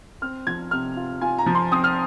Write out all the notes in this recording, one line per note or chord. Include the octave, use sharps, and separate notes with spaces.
C4 F6
F3 G#6
C3 F6
F4
F4 G#5
A#5
F3
C6
C4 D#6
F6